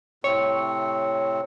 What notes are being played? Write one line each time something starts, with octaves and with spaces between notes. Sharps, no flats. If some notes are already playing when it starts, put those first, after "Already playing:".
A2 C3 C4 C#5